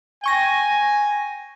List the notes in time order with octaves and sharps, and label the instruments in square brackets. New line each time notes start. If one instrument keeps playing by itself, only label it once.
[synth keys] G5 C#6 A#6 [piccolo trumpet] G#5